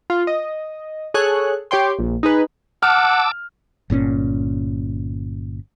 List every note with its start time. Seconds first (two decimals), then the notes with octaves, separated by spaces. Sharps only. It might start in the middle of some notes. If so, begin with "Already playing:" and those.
0.10 F4
0.27 D#5
1.14 G#4 A4 C#5 F#6
1.71 G4 C#5 G5 C6
1.99 A#1
2.23 D#4 G#4 B4
2.83 F#5 A5 D6 E6 F6
3.90 G1 A#2 C4 C#4